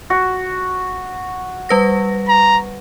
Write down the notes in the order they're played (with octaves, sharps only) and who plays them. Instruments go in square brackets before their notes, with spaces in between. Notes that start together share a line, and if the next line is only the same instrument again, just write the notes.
[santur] F#4
[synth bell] G3 B4 A#6
[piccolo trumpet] A#5